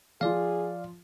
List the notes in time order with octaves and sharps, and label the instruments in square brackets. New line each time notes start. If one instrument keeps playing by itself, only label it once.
[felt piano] F3 F4 [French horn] G#4 [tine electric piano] D5 F5